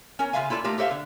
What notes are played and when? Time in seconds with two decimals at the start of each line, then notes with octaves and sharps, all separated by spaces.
0.19 C#4 A#4
0.33 C#3 D4 F4 E5 F5 G#5
0.50 E4 F4 A4 B4 D5
0.64 A3 D#4 F4 G4 A#4
0.78 G4 A4 C5 E5 F5
0.91 D3